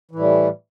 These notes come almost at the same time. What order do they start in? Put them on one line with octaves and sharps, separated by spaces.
E3 A2 G3